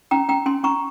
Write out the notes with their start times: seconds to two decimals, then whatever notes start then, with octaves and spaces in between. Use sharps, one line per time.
0.11 C#4 G5 A#5
0.29 C#4 G5 A#5
0.46 C#4 G#5 C6
0.63 C#4 A#5 C#6